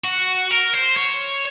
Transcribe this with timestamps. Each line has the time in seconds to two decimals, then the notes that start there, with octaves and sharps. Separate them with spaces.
0.04 F#4
0.51 A#4
0.74 C5
0.97 C#5